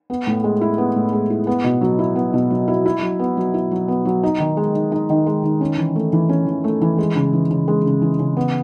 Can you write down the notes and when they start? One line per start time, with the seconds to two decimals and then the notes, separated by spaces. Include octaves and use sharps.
0.10 B3
0.27 A2
0.44 G#3
0.61 E4
0.78 B3
0.96 A2
1.13 G#3
1.30 E4
1.47 B3
1.64 B2
1.81 F#3
1.99 E4
2.16 B3
2.34 B2
2.51 F#3
2.68 E4
2.86 E4
3.02 F#3
3.19 B3
3.37 F#3
3.54 E4
3.71 F#3
3.88 B3
4.05 F#3
4.23 D#4
4.40 D#3
4.57 G#3
4.75 D#3
4.92 D#4
5.10 D#3
5.27 G#3
5.44 D#3
5.61 C#4
5.78 E3
5.95 A3
6.13 E3
6.29 C#4
6.46 E3
6.64 A3
6.81 E3
6.98 G#3
7.16 C#3
7.33 E3
7.51 C#3
7.68 G#3
7.85 C#3
8.02 E3
8.19 C#3
8.37 B3